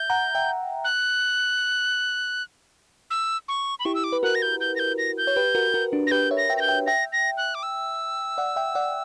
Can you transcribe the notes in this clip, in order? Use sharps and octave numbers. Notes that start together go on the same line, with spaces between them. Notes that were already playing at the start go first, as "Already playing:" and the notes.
Already playing: E5 G6
F#5 A#5
E5 G5
F#6
E6
C#6
B5
E4 G4 C#6
E6
D6
B4
F#4 A#4 F#6
A#6
G6
G6
A#6
G6
A#6
G6
C#5
G4 B4
F#4 A#4
F#4 A#4
D4 F#4
A#6
G4 B4 G6
C#5 E5
A#6
E5 G5
A#6
G6
E5 G5
E5 G5 A#6
A#6
F#6
D6
E6
D5 F#5
E5 G5
D5 F#5